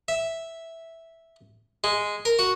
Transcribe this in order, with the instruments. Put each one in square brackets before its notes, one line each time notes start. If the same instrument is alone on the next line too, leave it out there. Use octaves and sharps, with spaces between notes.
[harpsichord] E5
G#3
A#4
F#4